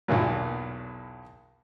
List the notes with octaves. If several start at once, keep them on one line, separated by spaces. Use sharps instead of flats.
B1 E2 A#2 F#3